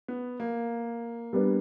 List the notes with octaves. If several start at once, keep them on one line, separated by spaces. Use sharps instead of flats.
B3
A#3
G3 B3 D4